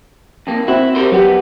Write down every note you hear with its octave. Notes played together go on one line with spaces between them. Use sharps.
F2 A#3
C4 E4 F#4
G4 A#4 C5
F#3 B3 G4